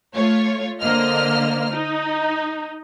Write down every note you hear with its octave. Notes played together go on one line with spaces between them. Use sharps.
A3 F4 C#5
D3 A#3 C5 D#5 F6
D#4